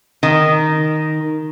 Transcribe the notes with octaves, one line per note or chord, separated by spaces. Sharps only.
D#3